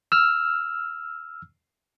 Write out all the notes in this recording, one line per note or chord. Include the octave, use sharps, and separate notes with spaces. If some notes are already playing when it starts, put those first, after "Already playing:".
E6 F6